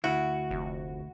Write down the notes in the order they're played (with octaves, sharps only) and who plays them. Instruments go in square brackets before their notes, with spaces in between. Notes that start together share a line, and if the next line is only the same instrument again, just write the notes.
[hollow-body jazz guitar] D2 E4 [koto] F#4
[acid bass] F1